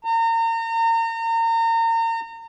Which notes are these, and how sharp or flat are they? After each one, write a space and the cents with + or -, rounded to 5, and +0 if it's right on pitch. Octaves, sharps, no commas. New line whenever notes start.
A#5 -35